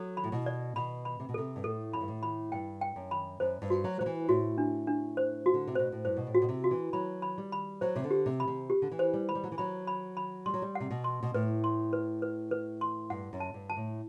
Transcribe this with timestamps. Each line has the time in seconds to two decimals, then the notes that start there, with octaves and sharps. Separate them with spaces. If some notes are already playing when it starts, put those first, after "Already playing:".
Already playing: F#3 A4
0.17 B5
0.24 A2
0.32 B2
0.46 D5
0.76 B2 B5
1.05 B5
1.20 C3
1.29 B2
1.34 C3 A4
1.56 G2
1.64 A2 A4
1.93 F#2 B5
2.01 G2
2.08 A2
2.23 B5
2.52 G2 G5
2.81 G5
2.96 F#2
3.11 B5
3.40 F#2 C5
3.62 G2
3.70 F#4
3.84 F#3
3.99 F#3 C5
4.06 E3
4.29 A2 F#4
4.58 D4
4.87 D4
5.17 C5
5.46 F#4
5.54 D3
5.67 C3
5.75 B2 C5
5.92 A2
6.05 G2 C5
6.17 B2
6.27 A2
6.35 F#4
6.42 B2
6.49 C3
6.64 F#4
6.71 E3
6.93 F#3 B5
7.22 B5
7.38 G3
7.52 B5
7.81 F#3 C5
7.96 C3
8.04 D3
8.11 G4
8.26 C3
8.40 B5
8.48 C3
8.70 G4
8.82 D3
8.92 E3
8.99 C5
9.14 G3
9.29 B5
9.35 G3
9.44 F#3
9.52 E3
9.58 F#3 B5
9.87 B5
10.17 B5
10.46 G3 C6
10.54 F#3
10.62 G3
10.75 C3 F#5
10.91 B2
11.04 C6
11.23 B2
11.34 A2 B4
11.64 C6
11.93 B4
12.22 B4
12.51 B4
12.81 C6
13.10 G2 F#5
13.33 F#2
13.40 A5
13.54 G2
13.70 A5
13.77 A2